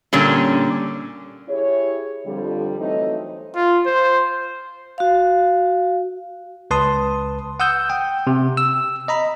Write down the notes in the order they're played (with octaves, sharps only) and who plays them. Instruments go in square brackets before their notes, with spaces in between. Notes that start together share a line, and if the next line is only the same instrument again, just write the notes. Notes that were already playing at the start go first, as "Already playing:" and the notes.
[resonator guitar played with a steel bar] A#2 D3 G3 C#4
[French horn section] E4 G4 G#4 C#5
F2 D3 G3
E3 F#3 A3 C4 D#4
[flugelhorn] F4
C5
[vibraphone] F#4 F5
[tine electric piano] C#2 B4 A5 C6 D#6
F#5 D#6 E6 G6
G5
C3
E6
D#5 A#5 B5